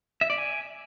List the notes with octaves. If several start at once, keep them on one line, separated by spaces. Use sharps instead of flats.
E5
D5
G#5